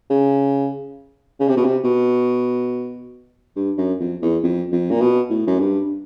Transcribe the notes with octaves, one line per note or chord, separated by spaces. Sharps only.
C#3
C#3
C3
B2
C3
B2
G2
F#2
F2
E2
F2
F2
A#2
B2
A2
F#2
G2